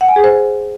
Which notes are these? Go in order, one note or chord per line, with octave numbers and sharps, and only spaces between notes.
F#5
G#5
G#4
C5